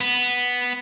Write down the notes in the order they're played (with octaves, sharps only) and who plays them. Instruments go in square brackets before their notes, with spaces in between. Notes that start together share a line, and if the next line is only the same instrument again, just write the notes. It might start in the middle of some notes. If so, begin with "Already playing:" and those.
[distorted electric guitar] B3